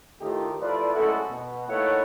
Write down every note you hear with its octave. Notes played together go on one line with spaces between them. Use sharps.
A2 D#3 A3 D#4 F4 G4
F3 A3 E4 B4 D5
F#2 G#3 A3 E4 F#4 A4
B2
A3 A#3 D#4 E4 C#5 F#5